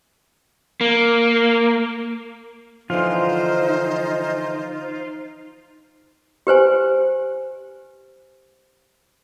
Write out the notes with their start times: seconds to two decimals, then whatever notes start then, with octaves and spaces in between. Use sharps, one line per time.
0.81 A#3
2.90 D3 E3 F3 D#4 F4 C5
6.47 G4 B4 C5 G#5